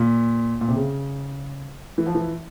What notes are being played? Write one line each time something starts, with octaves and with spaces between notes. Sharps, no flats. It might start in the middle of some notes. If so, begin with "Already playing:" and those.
Already playing: A#2
A#2
C3
C#3
E3
F3
E3